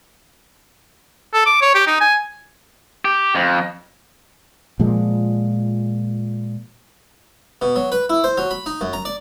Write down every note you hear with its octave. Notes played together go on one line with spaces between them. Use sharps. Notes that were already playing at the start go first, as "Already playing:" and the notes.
A4
D6
C#5
G4
D#4
G#5
G4
F2
A#2 F3 G#3
B2
F#3
B4
E4
C5
F#3
B5
D#4
F#2
A#5
D5